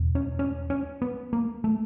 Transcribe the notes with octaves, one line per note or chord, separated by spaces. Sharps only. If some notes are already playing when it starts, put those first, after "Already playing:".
Already playing: E2 B2
C#4
C#4
C#4
B3
A#3
A3